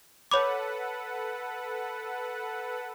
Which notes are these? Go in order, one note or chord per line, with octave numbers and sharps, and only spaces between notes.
A4 B4 C#5 F#5 B5 D6